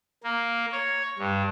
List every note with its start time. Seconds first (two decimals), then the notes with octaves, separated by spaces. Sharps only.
0.23 A#3
0.72 C#5
1.19 G2